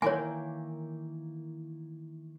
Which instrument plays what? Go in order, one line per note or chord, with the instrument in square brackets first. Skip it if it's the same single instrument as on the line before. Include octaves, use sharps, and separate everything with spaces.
[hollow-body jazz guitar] D#3 E3 A#3 [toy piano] C#5 G#5